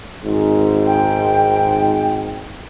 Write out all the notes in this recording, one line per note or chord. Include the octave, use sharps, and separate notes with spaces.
G#1 G#2
G5